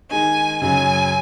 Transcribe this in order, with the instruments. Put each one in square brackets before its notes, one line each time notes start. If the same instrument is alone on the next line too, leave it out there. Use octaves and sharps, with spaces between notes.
[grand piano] D#3 G#3 D#4 [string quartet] G#5
[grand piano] F#2 C#3 F#3 [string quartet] G#5